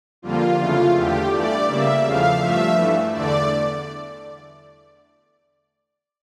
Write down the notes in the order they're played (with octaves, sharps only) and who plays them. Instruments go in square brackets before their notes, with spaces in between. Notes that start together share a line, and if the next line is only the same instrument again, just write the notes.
[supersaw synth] F2 D3 G3 A#3 F4
F2 C#3 E3 A3 F4
E2 D3 A3 G4
G2 E3 A3 D5
C#3 G3 A#3 E5
E2 C#3 F3 A3 F5
G2 F3 A3 E5
G2 E3 A3
E2 D3 A3 D5